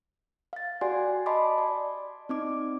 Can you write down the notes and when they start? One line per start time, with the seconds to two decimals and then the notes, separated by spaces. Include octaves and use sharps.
0.53 F5 A6
0.81 F#4 G4 D5 F#5 G#5 C6
1.26 D#5 A5 B5 C6 D6
1.58 D5
2.29 C4 D#4 D6